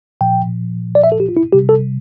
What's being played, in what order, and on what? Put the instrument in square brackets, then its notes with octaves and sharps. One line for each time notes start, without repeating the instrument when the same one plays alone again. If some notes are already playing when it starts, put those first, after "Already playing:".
[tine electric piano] A#2 F3 G5
D5
E5
A4
G4
F4
E4
C3 G3 G4
A4